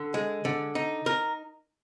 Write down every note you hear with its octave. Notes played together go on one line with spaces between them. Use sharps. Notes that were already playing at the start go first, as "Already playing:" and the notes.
Already playing: D3
G#3
D3
D#4
A#4